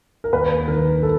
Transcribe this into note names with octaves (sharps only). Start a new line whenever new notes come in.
A#4
D#2 B4
D#3 A#4
A4